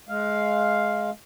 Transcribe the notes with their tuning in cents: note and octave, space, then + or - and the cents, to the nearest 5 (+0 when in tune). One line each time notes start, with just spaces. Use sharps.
G#3 +20 F5 +0